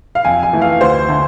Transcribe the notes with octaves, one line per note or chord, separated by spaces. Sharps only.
F5
F2 G#5
G#5
E3 A3
F5
D2 C5
D3 A3